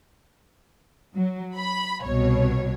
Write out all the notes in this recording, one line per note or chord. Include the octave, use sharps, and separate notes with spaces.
F#3
B5
C2 B2 C#5